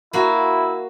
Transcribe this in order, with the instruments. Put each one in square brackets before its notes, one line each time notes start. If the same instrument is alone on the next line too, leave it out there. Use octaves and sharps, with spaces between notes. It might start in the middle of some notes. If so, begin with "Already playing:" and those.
[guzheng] A#3 F#4 [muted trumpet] E4